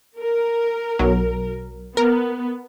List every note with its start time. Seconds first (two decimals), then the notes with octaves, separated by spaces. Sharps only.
0.21 A#4
0.99 B1 F#3
1.97 B3 A#4